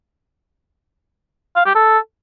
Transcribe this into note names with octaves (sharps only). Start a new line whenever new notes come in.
F5
G4
A4